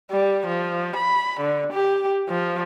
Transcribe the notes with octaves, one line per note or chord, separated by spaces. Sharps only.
G3
F3
B5
D3
G4
F3